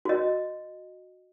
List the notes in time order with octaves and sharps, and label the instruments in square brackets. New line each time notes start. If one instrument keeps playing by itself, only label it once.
[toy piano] F#4 D#5